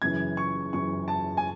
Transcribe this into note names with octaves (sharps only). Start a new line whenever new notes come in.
F#1 F#2 C#3 E3 G#6
C#6
F#1 F#2 C#3 E3 C#6
A5
G#5